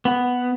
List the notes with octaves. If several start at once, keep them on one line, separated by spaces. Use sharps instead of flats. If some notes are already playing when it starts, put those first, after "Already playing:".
B3